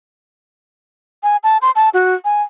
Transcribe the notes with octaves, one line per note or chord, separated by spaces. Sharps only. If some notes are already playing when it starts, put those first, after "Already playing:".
G#5
A5
C6
A5
F#4
G#5